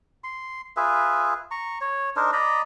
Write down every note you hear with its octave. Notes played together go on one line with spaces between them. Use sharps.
C6
F4 G#4 B4 E5
A#5 C#6
C#5
D4 D#4 A#4 C5
D5 D#5 A#5 B5